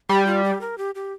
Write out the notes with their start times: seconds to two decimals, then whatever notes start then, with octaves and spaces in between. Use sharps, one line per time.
0.09 G3 G4
0.26 F4
0.44 G4
0.61 A#4
0.78 G4
0.95 G4